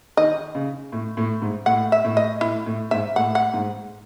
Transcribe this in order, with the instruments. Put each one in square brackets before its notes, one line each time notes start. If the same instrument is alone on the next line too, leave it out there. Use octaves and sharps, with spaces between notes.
[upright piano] D#3 [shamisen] D#5
[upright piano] C#3
A2
A2
G#2
[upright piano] A2 [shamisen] F#5
[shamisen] E5
[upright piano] A2
[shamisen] D#5
[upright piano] A2 [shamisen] E4
[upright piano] A2
[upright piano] G#2 [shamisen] E5
[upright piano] A2 [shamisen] F#5
[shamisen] F#5
[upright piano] G#2